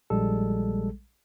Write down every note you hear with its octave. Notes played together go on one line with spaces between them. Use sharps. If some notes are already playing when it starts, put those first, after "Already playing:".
A#1 G3 G#3 A4